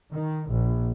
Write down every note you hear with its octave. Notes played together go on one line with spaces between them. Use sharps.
D#3
A#1